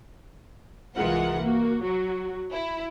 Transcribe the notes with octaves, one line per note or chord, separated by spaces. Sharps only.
C2 E3 G#3 F4 A#4 F#5
A#3 F#4
F#3 F#4
E4